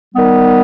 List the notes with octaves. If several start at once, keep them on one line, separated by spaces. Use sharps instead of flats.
D#3 G3 B3